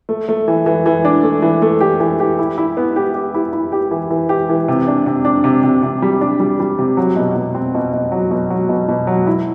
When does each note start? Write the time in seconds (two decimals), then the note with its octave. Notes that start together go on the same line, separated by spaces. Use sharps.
0.09 A3
0.29 A3
0.48 E3
0.66 E3
0.86 E3
1.05 D4
1.23 A3
1.42 E3
1.62 A3
1.81 G4
2.00 E3
2.20 G4
2.39 E4
2.58 E4
2.77 B3
2.96 G4
3.14 G4
3.34 E4
3.53 E4
3.72 G4
3.91 E3
4.10 E3
4.29 G4
4.49 E3
4.68 C3
4.88 D4
5.06 C3
5.25 D4
5.44 C3
5.63 C3
5.82 C3
6.02 G3
6.21 D4
6.40 G3
6.60 G3
6.79 C3
6.97 F#3
7.16 B2
7.35 B2
7.55 C4
7.74 B2
7.93 B2
8.12 F#3
8.31 B2
8.50 F#3
8.69 B2
8.88 B2
9.07 F#3
9.27 E4